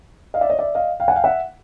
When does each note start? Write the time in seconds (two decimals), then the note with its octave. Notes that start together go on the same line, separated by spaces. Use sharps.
0.34 D#5 F5
0.41 D5 E5
0.49 C#5 D#5
0.59 D5 E5
0.75 D#5 F5
1.00 F5 G5
1.08 F#5 G#5
1.16 F5 G5
1.24 E5 F#5